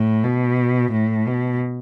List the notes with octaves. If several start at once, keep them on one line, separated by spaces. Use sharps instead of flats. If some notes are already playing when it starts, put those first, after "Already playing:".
Already playing: A2
B2
A2
B2